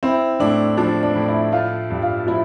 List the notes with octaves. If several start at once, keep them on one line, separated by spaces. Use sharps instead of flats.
C4 E4
A2 D4
F3 D4
D4
A2
E4
A3 F4
G2
F4
F3 E4